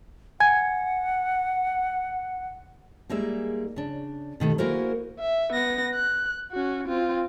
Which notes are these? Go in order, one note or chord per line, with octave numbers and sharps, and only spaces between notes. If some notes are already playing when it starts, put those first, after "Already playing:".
F#5 G#5 G#6
G3 G#3 A#3 D#4 G#4 E5
C#3 D4
B2 D#3 A3 G4
A#3 E4 F#4 G#4 A#4 C5
E5
B3 A#6
F#6
C#4 F#4
C4 F4